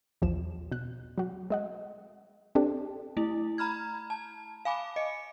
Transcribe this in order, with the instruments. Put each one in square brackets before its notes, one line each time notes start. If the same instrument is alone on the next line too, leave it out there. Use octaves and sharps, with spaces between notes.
[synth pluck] A#1 E2 F3 E7
B2 F#6
F#3 F#4
G#3 D#5 F#5
C4 D4 G4 A4
[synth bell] A3 E4
A#5 B5 F6 G#6
A5
F5 G#5 B5 D6
D#5 C#7